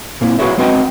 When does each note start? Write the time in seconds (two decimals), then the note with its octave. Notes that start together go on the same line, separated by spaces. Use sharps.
0.21 A#2 A#3 C4 E4
0.39 F#4 G#4 B4 C#5 E5
0.58 G#3 C4 F#4 B4 D#5 G5